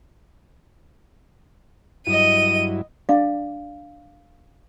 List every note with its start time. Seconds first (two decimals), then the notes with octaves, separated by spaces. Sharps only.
2.07 G2 F#3 E4 D#5 D#7
3.09 D4 D5 F5